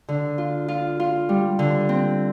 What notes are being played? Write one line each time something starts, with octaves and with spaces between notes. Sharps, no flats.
D3
F4
F4
F4
G3
D3
C4